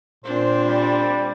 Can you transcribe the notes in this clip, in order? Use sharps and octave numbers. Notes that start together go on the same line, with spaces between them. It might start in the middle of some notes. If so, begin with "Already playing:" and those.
A#2 C4 D4 C5
G3